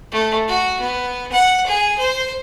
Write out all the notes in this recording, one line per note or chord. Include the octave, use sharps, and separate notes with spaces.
A3
F#4
B3
F#5
G#4
C5